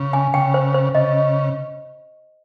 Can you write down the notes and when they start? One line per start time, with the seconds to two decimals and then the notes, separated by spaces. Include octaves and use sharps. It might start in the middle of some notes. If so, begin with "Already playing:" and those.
Already playing: C#3
0.13 G#5
0.34 C#3 G5
0.54 C5
0.74 C5
0.95 C#3 D#5